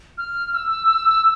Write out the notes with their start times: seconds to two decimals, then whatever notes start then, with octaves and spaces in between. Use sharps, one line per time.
0.18 F6
0.54 E6